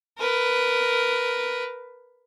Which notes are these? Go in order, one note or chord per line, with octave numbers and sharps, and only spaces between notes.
A#4 B4